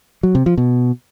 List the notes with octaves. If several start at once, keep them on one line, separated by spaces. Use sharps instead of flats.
F#3
C3
F3
B2